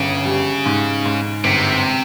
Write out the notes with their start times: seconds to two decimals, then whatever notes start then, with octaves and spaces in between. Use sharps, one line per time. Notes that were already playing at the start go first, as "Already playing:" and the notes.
Already playing: G1 C#3
0.26 G3
0.66 G#2
1.05 G#2
1.44 G1 C3